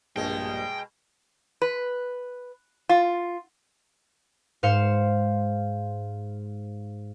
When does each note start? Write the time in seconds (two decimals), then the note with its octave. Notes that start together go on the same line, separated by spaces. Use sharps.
0.16 A#1 G2 B2 G#3 G5
1.62 B4
2.89 F4
4.63 G#2 C5 F5 C#7 E7